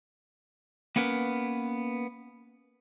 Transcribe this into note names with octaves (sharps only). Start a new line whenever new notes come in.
A#3 B3 C#4 A#4 B4